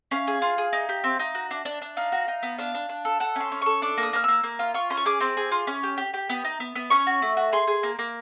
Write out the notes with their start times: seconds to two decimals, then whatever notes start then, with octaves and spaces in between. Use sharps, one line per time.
0.11 C#4 F5
0.27 G#4
0.42 F4
0.58 G#4
0.73 D#4
0.89 G4
1.04 C4
1.19 D#4
1.35 F#4
1.51 D4
1.65 D4
1.82 D4
1.97 D#4 F5
2.12 F#4
2.28 D#4
2.43 B3
2.58 D4 F5
2.74 D4
2.89 D4
3.05 A4
3.20 A4 F#5
3.36 C#4 C6
3.52 C#4
3.62 A4 C#6
3.82 D4 D6
3.97 A#3
4.03 D#6
4.13 A#3 F6
4.24 A#3 E6
4.43 A#3
4.59 F4
4.74 F4 C#6
4.90 C#4 C6
4.97 C#6
5.06 G#4 D6
5.21 C4
5.37 G#4
5.52 F4
5.67 C#4
5.83 G4
5.98 G4
6.14 G4
6.29 B3
6.45 D#4
6.60 B3
6.75 B3
6.90 C#4 C#6
7.07 F#4
7.22 A3
7.37 F#4
7.53 G#4 C6
7.67 G#4
7.83 A#3
7.99 A#3